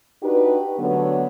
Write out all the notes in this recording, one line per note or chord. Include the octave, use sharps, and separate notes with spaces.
D4 D#4 F#4 G4 B4
D3 F#3 A3 B3 C#5